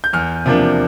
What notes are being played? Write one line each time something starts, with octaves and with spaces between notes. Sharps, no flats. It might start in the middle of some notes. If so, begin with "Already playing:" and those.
G6
E2 F6
C3 F3 A#3 D4